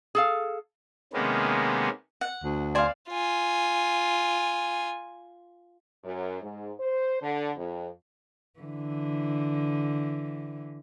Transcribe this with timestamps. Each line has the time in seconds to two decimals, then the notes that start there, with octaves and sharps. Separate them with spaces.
0.15 G#4 A4 F5
1.13 C3 D#3 G#3 A#3 B3 C#4
2.21 F#5
2.43 D2
2.75 C5 D5 F5 G#5
3.10 F4 G#5
6.03 F#2
6.42 G#2
6.80 C5
7.22 D3
7.57 F2
8.59 D3 E3